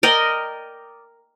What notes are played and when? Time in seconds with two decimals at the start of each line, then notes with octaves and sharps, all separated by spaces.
0.03 A#4 D5 D#5 G5